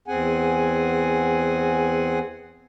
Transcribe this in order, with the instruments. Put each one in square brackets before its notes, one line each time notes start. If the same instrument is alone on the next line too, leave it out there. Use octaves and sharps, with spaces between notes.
[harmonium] E2 C4 G#4 F#5 G#5